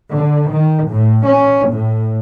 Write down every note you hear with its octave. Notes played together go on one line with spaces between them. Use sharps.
D3
D#3
A2
C#4
A2